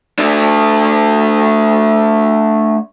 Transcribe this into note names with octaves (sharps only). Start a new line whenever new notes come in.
A3 D4